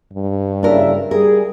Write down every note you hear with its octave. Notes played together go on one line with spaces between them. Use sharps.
G2
F#1 C#3 D4 A#4 E5
G3 G#4 A#4